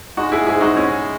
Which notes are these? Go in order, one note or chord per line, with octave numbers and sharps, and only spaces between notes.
G#3 D#4 F#4
E4 G#4
G#2 E4 G#4
D#4 F#4
G#3 C#4 E4